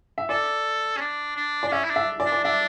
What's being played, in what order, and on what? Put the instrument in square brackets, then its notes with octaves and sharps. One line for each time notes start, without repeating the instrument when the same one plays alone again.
[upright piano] E5
[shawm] A4 [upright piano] D5
[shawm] C#4
D4
D4
[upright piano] D5
[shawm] D4
[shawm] C#4 [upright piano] E5
[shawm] E4
D4
[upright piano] E5
D5
[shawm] D4
[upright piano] D5
[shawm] D4 [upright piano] E5